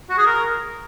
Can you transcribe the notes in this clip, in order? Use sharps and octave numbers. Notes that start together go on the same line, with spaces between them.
F#4
G#4
A#4